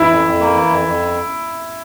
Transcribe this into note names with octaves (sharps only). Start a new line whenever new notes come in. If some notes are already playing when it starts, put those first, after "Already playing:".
Already playing: E3 E4
F2
F2
A#3
E3
F2
F2